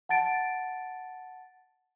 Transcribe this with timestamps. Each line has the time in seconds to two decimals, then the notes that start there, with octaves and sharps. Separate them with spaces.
0.09 F#5 A5 A6 D7